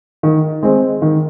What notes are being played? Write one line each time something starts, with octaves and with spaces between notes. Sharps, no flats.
D#3
G#3 C4
D#3